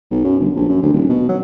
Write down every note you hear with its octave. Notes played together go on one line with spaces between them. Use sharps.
B1
F#2
G1
A#1
F#2
D2
D#1
B2
F#3